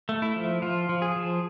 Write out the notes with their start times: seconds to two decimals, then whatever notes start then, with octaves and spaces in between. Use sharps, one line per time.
0.09 A3
0.22 E4
0.36 F3
0.62 F3 F4
0.89 F3
1.02 G#4
1.16 F3